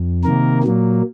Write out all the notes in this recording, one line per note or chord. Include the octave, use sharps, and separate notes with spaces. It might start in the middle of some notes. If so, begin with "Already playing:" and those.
Already playing: F2
C3 D#3 A#3 A#4
A#2 F#3 A#3